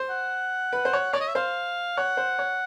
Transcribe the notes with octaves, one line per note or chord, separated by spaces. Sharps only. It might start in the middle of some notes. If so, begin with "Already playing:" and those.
Already playing: C5
F#5
B4
C5
C#5
C#5 D5
D#5
E5
C5 F5
C#5 F#5
C5
C#5